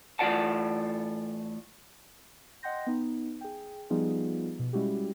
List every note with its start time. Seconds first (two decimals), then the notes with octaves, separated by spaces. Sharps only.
0.19 A2 E3 F4 D5 F#5 A5
2.63 D#5 F#5 G5 C6 G6 A#6
2.87 B3 D#4
3.41 G#4 G5
3.90 F3 G3 B3 D#4 F4 G#4
4.59 B2
4.73 G3 G#3 C#4 E4 F#4 G4